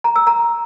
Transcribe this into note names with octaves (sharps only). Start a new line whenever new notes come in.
A#5
E6
A#5